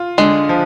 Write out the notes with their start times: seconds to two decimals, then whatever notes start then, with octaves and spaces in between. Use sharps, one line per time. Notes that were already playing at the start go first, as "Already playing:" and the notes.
Already playing: F4
0.18 D3 G#3
0.49 F3